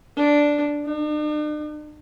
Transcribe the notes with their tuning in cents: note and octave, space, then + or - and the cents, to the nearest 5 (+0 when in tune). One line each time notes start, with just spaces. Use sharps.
D4 -5
D4 +45